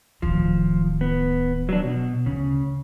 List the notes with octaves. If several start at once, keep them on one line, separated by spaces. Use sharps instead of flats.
D1 D#3 F3
B3
F#3 D4
B2
D2 C#3